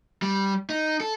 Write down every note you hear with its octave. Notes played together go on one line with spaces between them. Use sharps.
G3
D#4
A4